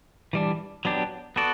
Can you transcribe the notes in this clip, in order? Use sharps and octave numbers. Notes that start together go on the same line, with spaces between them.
E3 G3 D4
F#3 B3 D4 G4
B3 F#4 A4 D5